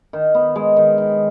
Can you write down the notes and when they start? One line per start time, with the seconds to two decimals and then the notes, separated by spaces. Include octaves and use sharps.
0.13 D#3
0.35 B3
0.56 G#3
0.77 D#3
0.98 D#3